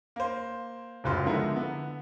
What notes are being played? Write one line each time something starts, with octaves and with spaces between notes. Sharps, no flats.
A#3 C5
D1 C#2 F#2 F4 C5
D3 F3 G#3 B3 E4 A#4
D3 B3